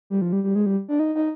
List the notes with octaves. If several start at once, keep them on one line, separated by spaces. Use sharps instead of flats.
G3
F3
G3
G3
G#3
G3
D4
D#4
D#4